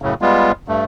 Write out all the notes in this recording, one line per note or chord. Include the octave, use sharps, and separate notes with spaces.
F#2 A2 C#3
G3 G#3 B3 F4
G2 A3